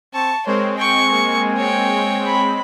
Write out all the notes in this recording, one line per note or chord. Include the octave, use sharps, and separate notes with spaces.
C4 A5 C#6
G#3 C4 A#4 C5 C#5
G5 G#5 C#6
A#3
C#5 G5
B5